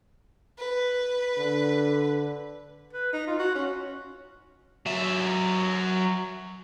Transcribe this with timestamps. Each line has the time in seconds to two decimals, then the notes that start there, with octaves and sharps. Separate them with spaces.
0.58 B4
1.38 D3
2.93 B4
3.13 D#4
3.27 F4
3.39 F#4
3.55 C#4
4.86 F#3 E5